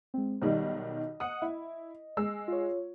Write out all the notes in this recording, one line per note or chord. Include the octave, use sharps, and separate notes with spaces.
G#3 C4
B1 D#3 G3 D#5
F#5 D#6
E4
G#3 E6
F4 C#5